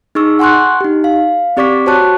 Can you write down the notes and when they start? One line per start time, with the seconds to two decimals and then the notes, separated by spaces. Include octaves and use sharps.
0.15 D#4 G#4 C#6 E6
0.39 F#5 G#5 C6 C#6 F#6
0.81 D#4 G4
1.04 F5
1.57 C4 G4 D5 C#6 D6 B6
1.86 F#4 C5 C#5 A5 C#6 F#6